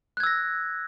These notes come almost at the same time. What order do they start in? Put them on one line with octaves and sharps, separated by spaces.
F#6 G#6 E6 A#6